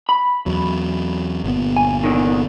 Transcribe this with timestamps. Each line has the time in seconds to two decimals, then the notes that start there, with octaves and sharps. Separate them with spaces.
0.09 B5
0.46 E2 F#3
1.44 G1 A#2 B3
1.76 G#5
2.04 E2 D3 D#3